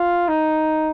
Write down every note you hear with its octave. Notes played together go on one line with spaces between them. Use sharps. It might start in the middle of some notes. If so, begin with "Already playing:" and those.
Already playing: F4
D#4